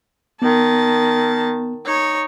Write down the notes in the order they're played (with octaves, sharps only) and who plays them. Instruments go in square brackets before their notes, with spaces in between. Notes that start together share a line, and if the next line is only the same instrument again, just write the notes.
[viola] D#3 A5 [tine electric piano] B3
[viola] D#4 C#5